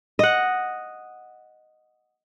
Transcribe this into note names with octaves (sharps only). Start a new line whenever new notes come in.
D#5 F#5